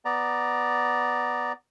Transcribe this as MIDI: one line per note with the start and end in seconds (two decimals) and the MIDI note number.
0.05 1.52 59
0.05 1.52 74
0.05 1.52 82